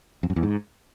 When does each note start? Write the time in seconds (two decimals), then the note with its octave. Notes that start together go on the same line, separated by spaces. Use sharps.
0.23 F2
0.30 F#2
0.36 E2
0.43 G#2